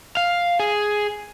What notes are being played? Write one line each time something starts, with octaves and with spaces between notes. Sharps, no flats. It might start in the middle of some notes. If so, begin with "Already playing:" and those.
F5
G#4